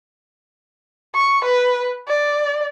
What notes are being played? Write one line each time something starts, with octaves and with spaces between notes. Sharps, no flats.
C#6
B4
D5